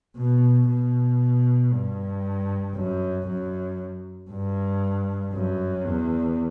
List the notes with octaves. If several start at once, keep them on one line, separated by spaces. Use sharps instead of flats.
B2
B2
G2
F#2
F#2
G2
F#2
E2